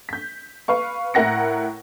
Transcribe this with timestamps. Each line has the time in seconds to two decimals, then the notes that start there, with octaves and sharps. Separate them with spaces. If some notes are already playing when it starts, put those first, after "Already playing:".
0.09 G6 B6
0.68 B4 F5 C#6
1.14 A2 E4 A#4 F#5 A#6 C#7